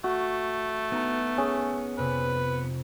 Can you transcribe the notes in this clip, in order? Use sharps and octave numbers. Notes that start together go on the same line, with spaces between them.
A3 F#4
B3 D#4 A#5
C#4 G#4
F2 C3 B4